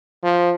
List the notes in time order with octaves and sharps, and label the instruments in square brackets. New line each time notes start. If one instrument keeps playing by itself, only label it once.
[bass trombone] F3